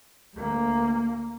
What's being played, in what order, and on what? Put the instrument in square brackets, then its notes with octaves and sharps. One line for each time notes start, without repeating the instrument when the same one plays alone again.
[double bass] D2 A#3